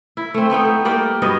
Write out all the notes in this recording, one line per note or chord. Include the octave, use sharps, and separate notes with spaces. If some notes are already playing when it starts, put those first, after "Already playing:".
E4
A3 C4
A3 B3 D#4 G5
A3
G3 A#3 D5 G5
G2 F#3 B3 D#5